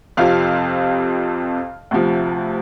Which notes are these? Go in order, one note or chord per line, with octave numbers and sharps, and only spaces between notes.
F2 C3 F3 F5
D2 C3 F3